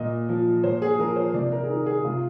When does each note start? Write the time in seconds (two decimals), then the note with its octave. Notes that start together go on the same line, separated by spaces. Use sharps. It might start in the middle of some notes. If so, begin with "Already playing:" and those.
Already playing: A#2 D#5
0.29 F3
0.64 A#2 C5
0.82 G#4
0.99 F3 A#4
1.16 C5
1.33 C3 D5
1.52 A#4
1.63 G#4
1.69 D#3 A#4
1.86 G#4
2.04 C3 F4